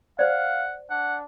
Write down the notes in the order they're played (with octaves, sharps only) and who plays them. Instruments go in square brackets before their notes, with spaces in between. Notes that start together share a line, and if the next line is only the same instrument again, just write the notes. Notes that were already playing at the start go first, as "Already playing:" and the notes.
[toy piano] C5 D5 [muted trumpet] F5 [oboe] F#5
[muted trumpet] D4 [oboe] F#5